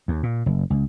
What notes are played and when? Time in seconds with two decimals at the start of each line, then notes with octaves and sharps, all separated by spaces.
0.08 D#2
0.23 A#2
0.46 F#1
0.70 C#2